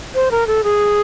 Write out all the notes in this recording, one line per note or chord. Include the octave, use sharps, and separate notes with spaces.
C5
A#4
A4
G#4